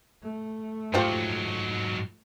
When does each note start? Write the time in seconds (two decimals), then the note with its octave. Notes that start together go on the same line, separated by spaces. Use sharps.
0.23 A3
0.94 G#2 F#3 F4 G4 C5